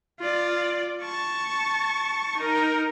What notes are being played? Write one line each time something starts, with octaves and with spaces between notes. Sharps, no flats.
F4 D5
A5 C#6
D#4 A#4